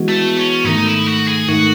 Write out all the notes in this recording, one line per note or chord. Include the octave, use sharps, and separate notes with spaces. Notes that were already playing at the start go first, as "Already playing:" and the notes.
Already playing: E3 G#3 B3 F#4
A3
C#4
G#2 D#3 A3 D#4
E4
F#4
G#4
G#2 D#3 A3 F#4